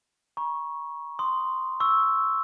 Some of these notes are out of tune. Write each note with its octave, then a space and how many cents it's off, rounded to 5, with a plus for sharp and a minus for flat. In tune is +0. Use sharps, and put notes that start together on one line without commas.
A#5 +40 C#6 +0
C6 -5 D#6 -10
C#6 +0 E6 +0